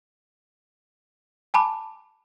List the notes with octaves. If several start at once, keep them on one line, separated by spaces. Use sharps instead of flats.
G#5 A5 B5 D6